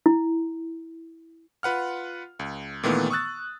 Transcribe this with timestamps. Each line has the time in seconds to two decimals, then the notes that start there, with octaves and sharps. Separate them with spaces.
0.06 E4
1.63 F4 B4 F#5 F6
2.39 C#2
2.83 A#2 D#3 E3 A3 B3
3.10 C#6 D#6 E6 F#6 A6